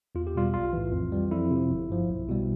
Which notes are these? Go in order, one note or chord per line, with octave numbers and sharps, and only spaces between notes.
E2 F4
G4
B2 G3 F4
B1 F4
A2 E3
F2
E3 G3
F2 E4
C3
F3
G1
G2 F3
B1
B2 G3